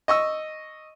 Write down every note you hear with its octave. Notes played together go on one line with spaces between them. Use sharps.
D#5 C#6 E6